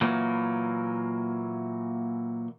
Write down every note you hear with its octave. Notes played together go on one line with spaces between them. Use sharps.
A#2 E3 F#3 A#3